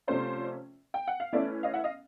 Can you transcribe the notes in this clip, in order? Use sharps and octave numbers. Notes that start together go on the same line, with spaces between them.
C3 F3 A3 C#4 C5 D5
G5
F#5
F5
E3 A3 C#4 D5 E5
D#5 F5
E5 F#5
D#5 F5